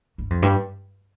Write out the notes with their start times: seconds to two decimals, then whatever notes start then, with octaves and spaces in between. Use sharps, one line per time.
0.18 G2
0.30 F2
0.42 G2